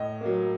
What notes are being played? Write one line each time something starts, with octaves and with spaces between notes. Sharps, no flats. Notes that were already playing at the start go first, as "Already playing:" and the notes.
Already playing: A2 D#5
F#3 A#3